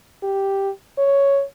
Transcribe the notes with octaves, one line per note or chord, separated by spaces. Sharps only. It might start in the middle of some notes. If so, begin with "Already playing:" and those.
G4
C#5